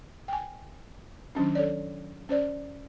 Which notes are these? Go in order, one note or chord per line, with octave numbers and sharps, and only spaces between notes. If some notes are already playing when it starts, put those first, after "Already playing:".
G5 G#5
D#3 F#3 C#4 D4
A4 C#5 D5
C#4 C5 D5